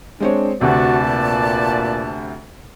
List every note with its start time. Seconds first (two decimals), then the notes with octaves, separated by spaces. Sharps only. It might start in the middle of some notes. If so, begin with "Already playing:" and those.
0.20 G#3 C4 D4 C#5
0.61 D2 C3 F#4 B4 D5 A5
1.06 A#2